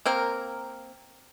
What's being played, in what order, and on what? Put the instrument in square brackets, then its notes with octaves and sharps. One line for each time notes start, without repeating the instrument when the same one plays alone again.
[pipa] A#3 C4 A#4